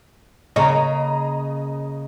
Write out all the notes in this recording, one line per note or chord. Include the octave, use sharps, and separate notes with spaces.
C#3 A#3 C#4 D#5 A#5